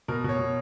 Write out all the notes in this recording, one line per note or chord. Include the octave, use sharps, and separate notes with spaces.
B2 A#4
B2 C#5
B2